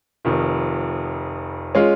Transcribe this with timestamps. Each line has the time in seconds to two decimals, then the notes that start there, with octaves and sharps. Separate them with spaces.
0.25 F1 F2 D#3
1.75 G#3 C#4 F4